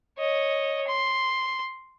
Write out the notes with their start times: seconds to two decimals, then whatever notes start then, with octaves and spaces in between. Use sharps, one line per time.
0.18 C#5 D#5
0.87 C6